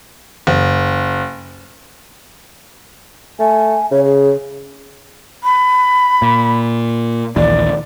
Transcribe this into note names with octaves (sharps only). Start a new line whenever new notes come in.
F#1
A3 G#5
C#3 C#5
G#4
B5
A#2
A#1 D#2 E3 D5